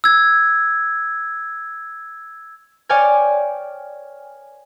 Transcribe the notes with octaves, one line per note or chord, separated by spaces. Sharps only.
E6 G#6
C#5 D5 G5 G#5 F6 G#6